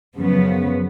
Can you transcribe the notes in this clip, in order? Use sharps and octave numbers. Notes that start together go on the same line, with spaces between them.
F#2 C#3 F3 B3